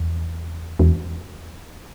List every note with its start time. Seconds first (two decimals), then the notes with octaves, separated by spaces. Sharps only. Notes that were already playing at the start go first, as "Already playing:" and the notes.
Already playing: E2
0.79 E2